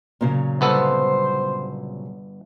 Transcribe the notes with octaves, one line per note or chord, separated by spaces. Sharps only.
A#2 C#3 F#3
G1 B3 A4 C5